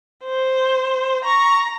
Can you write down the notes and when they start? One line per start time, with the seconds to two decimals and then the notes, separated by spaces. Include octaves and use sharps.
0.24 C5
1.25 A#5 C#6